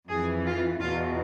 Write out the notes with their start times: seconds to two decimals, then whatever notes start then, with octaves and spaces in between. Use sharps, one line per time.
0.10 F2 E3 G#4
0.46 F4
0.81 E2 B2 F4